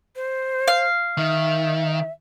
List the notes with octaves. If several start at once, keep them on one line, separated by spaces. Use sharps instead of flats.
C5
F5
D#3 E5